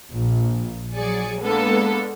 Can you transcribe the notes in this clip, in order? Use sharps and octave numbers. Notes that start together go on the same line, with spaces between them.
A#1
F#3 G#4 D5 G#5 C#7
G#3 A#3 B3 D4 A4 B4